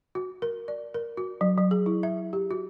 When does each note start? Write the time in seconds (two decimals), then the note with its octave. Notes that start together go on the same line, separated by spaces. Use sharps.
0.15 F#4
0.42 A#4
0.68 D5
0.94 A#4
1.17 F#4
1.41 F#3
1.58 F#3
1.71 G#4
1.86 E4
2.03 E5
2.33 G4
2.51 F#4